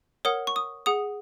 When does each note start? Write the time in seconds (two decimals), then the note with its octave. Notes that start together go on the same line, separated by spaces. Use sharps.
0.25 A#4 C#5 F#5 D#6
0.47 C#6
0.56 D#6
0.86 G#4 F#5 D#6